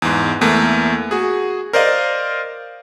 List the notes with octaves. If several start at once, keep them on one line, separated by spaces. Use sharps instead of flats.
E2 G#2
E2 A3 A#3
F#4 G#4
A#4 C5 D5 D#5 F5